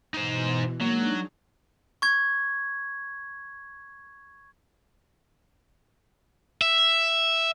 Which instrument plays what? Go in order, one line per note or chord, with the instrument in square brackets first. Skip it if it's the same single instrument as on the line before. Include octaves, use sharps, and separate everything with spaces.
[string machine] B2 E3 [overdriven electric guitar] D#4 C5
[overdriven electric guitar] F#3 [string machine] G#3 D4 D#4 [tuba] A#3
[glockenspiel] C#6 G#6
[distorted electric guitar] E5